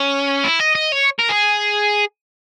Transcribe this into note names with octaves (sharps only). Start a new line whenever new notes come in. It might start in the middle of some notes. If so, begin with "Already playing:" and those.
Already playing: C#4
E4
D#5
D#5
C#5
A#4
G#4